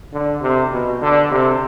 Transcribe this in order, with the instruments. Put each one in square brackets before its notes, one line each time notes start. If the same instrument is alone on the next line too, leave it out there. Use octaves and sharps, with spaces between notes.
[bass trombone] D3
C3
B2
D3
C3